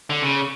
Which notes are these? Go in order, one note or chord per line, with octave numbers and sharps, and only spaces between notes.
D3
C#3